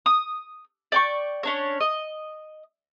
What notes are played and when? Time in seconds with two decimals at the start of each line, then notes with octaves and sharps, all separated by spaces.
0.06 D#6
0.92 D5 G5 C#6
1.43 C#4 D4 C#5
1.80 D#5